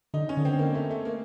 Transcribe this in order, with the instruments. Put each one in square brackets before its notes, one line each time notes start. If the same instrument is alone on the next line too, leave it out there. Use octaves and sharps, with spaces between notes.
[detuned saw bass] D3 [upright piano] D#4
[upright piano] C#4
[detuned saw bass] D3
[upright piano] C4
A#3
A3
A3
A#3